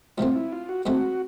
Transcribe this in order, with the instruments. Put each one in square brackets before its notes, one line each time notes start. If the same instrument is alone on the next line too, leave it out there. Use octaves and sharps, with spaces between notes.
[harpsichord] G#2 F3 A3 C4 [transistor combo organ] F4
[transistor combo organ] E4
F4
F#4
[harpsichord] G#2 F3 A3 C4 [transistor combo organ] F#4